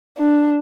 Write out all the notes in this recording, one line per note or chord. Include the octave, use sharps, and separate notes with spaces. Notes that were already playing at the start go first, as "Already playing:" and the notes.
D4